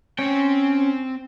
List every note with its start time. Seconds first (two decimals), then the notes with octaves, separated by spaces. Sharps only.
0.19 C4 C#4 G5